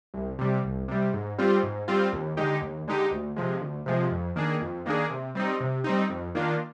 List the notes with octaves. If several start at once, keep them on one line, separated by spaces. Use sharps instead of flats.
C2
C3 G3
C2
C3 G3
G#2
G3 C4 F4
G#2
G3 C4 F4
D#2
D3 G#3 D#4 G4
D#2
D3 G#3 D#4 G4
D2
C3 F3 G#3
D2
C3 F3 G#3
F2
D#3 A#3 D4 G#4
F2
D#3 A#3 D4 G#4
C3
G3 C4 D#4
C3
G3 C4 D#4
F2
D#3 A#3 D4 F4